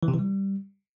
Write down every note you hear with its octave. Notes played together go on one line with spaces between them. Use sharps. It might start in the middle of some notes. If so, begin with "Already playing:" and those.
E3
C3
E3
G3